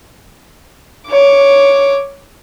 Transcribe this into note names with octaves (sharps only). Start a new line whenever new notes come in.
C#5 D6